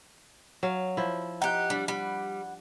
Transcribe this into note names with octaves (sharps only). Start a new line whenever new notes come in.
F#3 F5
F3 E4
D#4 G4 F#5 F#6
G3 D4
G3 F#5 B5